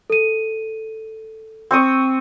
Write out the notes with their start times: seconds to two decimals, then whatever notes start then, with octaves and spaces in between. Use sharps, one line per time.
0.10 A4 D#7
1.71 C4 C#6 D#6